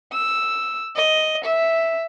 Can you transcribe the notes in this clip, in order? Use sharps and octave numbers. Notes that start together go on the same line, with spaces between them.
E6
D#5
E5